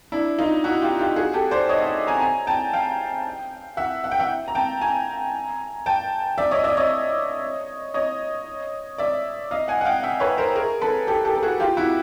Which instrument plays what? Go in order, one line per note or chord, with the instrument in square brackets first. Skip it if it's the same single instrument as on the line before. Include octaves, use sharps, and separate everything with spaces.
[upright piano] D4 E4
D#4 F4
E4 F#4
F4 G4
F4 G4
F#4 G#4
G4 A4
C5 D5
C#5 D#5
E5 F#5
G#5 A#5
G#5 A#5
G5 A5
F5 G5
E5 F#5
F#5
G5
E5 F#5
A#5
G5 A5
G#5 A#5
G5 A5
D5 E5
C#5 D#5
D5 E5
C#5 D#5
C#5 D#5
D5 E5
D#5 F5
F#5 G#5
F#5
F5 G5
E5 F#5
B4 C#5
A#4 C5
G#4 A#4
A4 B4
G4 A4
G4 A4
A4
F#4 G#4
F4 G4
E4 F#4